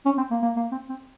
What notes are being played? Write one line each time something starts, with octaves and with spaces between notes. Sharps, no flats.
C#4
C4
A#3
A#3
A#3
C4
C4